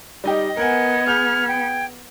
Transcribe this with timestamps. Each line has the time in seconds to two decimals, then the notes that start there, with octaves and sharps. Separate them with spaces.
0.24 G3 D#4 G4 D#5
0.57 B3 A#4 F#5 G#5 G#6
1.07 G#4 F6 G6
1.48 G5